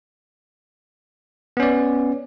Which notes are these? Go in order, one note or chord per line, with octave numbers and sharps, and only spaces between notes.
B3 C#4 D5